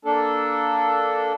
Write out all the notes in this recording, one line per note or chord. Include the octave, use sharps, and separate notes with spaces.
A#3 D4 A4